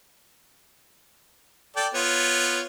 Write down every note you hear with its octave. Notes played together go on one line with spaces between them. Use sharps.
A4 D5 G5
B3 F4 C#5